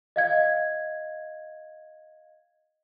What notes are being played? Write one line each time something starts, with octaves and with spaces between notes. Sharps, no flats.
D#5 F5 G#6